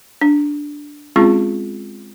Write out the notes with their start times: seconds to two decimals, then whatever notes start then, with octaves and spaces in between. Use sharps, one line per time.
0.21 D4
1.16 G#3 C4 C#4 F4 G#4